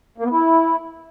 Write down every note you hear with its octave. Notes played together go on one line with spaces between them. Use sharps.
A#3
B3
E4